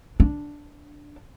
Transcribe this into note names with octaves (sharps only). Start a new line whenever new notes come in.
D4